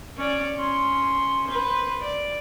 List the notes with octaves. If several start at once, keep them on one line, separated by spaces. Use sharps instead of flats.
C#4 D5
C#4 C6
B4 C5
D5